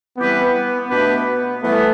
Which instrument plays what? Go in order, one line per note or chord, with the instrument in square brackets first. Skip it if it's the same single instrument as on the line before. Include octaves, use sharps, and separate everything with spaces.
[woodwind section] E3 G3 C4 G4 B4 [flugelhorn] B3
[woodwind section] B2 A3 D4 G4 B4 [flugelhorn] B3
[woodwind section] E3 G3 B3 [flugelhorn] A3